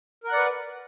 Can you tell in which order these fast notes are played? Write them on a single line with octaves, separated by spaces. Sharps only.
A#4 F#5 D5 B4